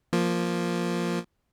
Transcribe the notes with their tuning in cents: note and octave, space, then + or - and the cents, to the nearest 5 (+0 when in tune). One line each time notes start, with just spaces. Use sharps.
F3 +0 A#3 +0